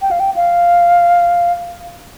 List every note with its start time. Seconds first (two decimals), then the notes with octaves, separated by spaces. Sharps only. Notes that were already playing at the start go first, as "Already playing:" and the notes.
0.02 G5
0.11 F5
0.20 G5
0.36 F5